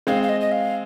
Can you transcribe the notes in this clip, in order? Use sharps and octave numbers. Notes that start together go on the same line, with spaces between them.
G#3 C4 F5
F5
D#5
D#5
F5